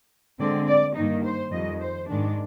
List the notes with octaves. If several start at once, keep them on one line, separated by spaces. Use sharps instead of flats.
D3 G#3 C4 D5
D5
G2 D#3 A#3 D#4
C5
F2 D#3 G3 D#5
C5
G#2 D#3 G#3 D4